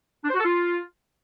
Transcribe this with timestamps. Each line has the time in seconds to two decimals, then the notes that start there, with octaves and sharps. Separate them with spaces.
0.24 D4
0.29 C5
0.35 F#4
0.40 A4
0.45 F4